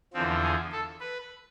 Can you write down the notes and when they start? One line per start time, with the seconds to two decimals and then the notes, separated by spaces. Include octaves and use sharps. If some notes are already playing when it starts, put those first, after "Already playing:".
0.13 E2 D3 F3 C4
0.43 G#4
0.72 A4
1.01 B4